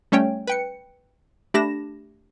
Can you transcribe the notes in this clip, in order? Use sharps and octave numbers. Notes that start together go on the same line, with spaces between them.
G3 A3 C#4 C#5 G5
B4 G5 C#7
A3 D4 G4 B5 A#6 E7